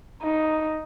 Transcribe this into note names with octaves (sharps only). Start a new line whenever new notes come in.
D#4